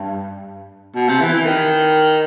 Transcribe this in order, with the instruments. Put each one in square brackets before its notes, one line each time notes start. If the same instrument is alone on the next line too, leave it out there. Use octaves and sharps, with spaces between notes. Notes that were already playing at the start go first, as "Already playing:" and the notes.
Already playing: [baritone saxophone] G2
B2
C3
E3
E3
D#3